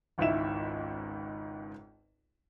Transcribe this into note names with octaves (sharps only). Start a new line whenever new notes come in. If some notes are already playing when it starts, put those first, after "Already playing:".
G#1 C#2 G#2 E4 E5 E7